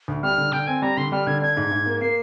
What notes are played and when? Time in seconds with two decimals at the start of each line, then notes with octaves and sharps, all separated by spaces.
0.08 D2
0.23 G3 F6
0.38 D3
0.52 D3 G5
0.67 C4 G#5
0.82 G3 A#5
0.97 D3 C6
1.12 G3 F6
1.27 D3 G#6
1.41 D4 G#6
1.57 G#2
1.71 G#2
1.86 A#3
2.01 A#3 C7